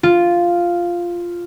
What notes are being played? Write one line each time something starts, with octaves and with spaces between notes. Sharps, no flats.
F4